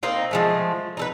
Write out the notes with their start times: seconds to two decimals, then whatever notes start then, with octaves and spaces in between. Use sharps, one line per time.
0.03 A#3 C4 D#4 F4
0.31 F3 G#3 A3
0.97 D#4 A4 B4